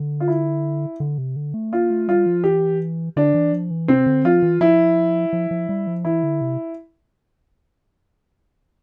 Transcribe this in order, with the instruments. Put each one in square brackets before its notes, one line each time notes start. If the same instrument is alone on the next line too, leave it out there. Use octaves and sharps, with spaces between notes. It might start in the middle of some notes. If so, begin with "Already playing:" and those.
Already playing: [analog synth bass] D3
[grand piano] F4
E4
[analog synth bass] D3
C3
D3
A3
[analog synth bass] A#3 [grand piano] F4
[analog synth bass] A3
[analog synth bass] G3 [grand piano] F4
[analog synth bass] F3
[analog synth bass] E3 [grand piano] G4
[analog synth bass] D3 [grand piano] D4
[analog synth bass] E3
F3
E3
[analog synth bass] C3 [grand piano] C4
[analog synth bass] D3
[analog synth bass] F3 [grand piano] F4
[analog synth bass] E3
[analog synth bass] F3 [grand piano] E4
[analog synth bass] F3
F3
G3
F3
[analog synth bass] E3 [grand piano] E4
[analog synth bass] D3
C3